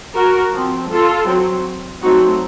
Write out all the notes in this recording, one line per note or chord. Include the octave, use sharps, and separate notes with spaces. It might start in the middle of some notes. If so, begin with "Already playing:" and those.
F#4 A#4
F3 C4
F4 A4
F#3 C4
F#3 A3 C4 D#4 F#4